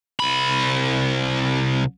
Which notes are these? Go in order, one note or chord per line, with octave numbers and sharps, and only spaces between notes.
C2 B5